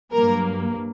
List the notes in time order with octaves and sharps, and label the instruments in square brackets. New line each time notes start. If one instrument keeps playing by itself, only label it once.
[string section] G2 F#3 A#3 A#4